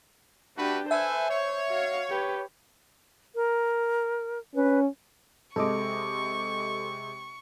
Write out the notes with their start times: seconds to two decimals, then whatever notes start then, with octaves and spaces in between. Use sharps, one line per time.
0.57 A3 D4 F#4 G4 B4
0.91 A4 B4 C5 E5 G#5
1.31 C#5
1.68 F#4 F5
2.10 G4 B4
3.35 A#4
4.55 C#4 B4
5.56 C3 G#3 A4 D#5 C#6 D6